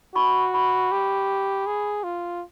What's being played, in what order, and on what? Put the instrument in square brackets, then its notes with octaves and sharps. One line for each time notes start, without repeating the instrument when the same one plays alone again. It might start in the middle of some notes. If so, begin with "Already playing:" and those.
[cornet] F#4 [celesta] B5 C#6
[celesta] B5 C#6
[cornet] G4
G#4
F4